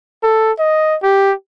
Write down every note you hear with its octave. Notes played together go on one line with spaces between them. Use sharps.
A4
D#5
G4